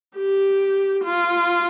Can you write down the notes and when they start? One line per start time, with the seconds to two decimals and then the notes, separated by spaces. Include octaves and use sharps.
0.17 G4
1.05 F4